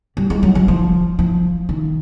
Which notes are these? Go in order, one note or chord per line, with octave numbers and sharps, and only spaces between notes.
G3
G#3
F#3
F#3
F3
F3
D#3